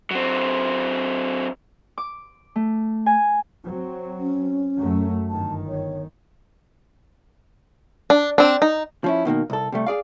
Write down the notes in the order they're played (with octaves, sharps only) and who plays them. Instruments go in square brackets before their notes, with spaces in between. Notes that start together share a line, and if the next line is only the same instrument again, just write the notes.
[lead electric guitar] F#3 C4
[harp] D6
A3
G#5
[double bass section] F#3 C4
[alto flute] C#4
[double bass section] F#2 F#3 A3
[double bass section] G1 D#3 [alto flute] A5
[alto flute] C#5
[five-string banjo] D4
C4 D4
D#4
[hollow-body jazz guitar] F3 C#4 E4
B2 D#3 A3 A#3
C2 A4
C3 G3 A3
G#4 D5 F5